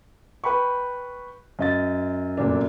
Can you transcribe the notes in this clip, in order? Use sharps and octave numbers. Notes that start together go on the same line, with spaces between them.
B4 G5 B5 C#6
F#2 D#5 A6
F1 F#2 A#2 D4